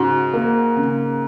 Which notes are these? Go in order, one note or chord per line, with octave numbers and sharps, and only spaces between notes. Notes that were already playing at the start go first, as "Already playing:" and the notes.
Already playing: G#2 C#3 F#4
A#3
C#3